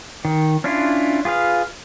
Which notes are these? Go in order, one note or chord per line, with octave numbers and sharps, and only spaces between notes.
D#3
C#4 D4 E4 F4
F4 G#4 B4 F5